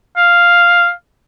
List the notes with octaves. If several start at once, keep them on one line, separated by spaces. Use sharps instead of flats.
F5